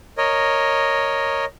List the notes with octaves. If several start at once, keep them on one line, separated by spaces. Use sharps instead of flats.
A#4 C#5 D#5